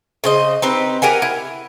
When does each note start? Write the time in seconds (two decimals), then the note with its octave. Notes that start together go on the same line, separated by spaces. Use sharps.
0.24 C#3 C5 D#5
0.62 C4 D#4 G4 B4
1.02 G4 A#4 F#5 G#5
1.22 E4